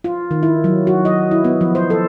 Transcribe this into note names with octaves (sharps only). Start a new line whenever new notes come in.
F4
D#3
E4
F#3
F#4
D#5
E4
B3
F3
C5
A4